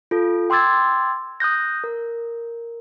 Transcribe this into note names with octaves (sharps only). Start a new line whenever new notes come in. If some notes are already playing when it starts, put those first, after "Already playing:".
F4 A4
G5 C6 D6 E6 G#6 A6
D#6 F#6 G6 A#6
A#4